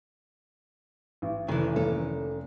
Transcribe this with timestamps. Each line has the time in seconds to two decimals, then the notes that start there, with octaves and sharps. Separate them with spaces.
1.22 A1
1.48 F1 D#3 E3
1.76 A#3 C#4 A4